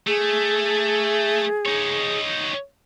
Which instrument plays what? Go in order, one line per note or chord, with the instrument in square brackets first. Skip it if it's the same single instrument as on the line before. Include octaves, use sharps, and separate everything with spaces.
[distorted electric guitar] A3 [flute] G#4
[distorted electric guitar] D#4 C#5